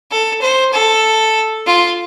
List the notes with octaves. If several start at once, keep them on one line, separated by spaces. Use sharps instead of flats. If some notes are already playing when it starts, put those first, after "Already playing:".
A4
C5
A4
F4